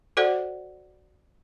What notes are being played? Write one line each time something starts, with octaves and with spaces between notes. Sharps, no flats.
F#4 A4 C5 D5 F#5